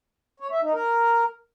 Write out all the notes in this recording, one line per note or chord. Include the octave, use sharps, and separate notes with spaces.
C#5
E5
D#4
A#4